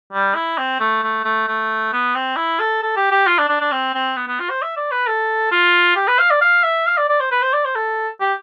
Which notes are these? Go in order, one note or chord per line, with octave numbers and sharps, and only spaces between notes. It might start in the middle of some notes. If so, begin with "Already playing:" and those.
G3
E4
C4
A3
A3
A3
A3
B3
C4
E4
A4
A4
G4
G4
F4
D4
D4
D4
C4
C4
B3
B3
F4
C5
E5
D5
B4
A4
F4
G4
B4
F5
D5
F5
E5
F5
D5
D5
C5
B4
C5
D5
C5
A4
G4